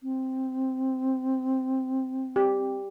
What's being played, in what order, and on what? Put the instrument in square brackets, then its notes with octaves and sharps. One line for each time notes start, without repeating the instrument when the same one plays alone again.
[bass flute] C4
[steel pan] G4